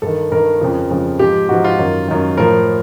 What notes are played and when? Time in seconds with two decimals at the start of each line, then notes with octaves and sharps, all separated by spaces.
0.02 G2 D#3 A4
0.31 G2 D#3 A#4
0.61 F2 C#3 F3
0.90 F2 C#3 F3
1.19 G#2 F3 G4
1.49 G#2 F3 F#4
1.64 F4
1.79 F#2 D#3
2.08 F#2 D#3
2.37 A2 F3 A#4